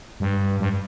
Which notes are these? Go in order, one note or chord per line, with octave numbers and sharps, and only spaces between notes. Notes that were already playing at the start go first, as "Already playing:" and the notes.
G2
G2